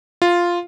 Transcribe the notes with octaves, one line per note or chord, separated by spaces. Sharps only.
F4